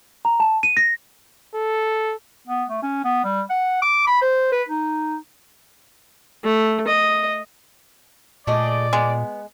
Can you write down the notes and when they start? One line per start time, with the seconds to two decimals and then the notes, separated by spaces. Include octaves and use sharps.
0.25 A#5
0.40 A5
0.63 D#7
0.77 A#6
1.55 A4
2.47 B3
2.69 A3
2.82 C#4
3.04 B3
3.24 G3
3.50 F#5
3.82 D6
4.07 B5
4.22 C5
4.52 B4
4.69 D#4
6.44 A3
6.88 D#5
8.47 A#2 A3 G#4 D5 D#5
8.93 G#3 B3